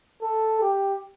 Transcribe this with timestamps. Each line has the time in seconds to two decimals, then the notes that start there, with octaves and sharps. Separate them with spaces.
0.22 A4
0.61 G4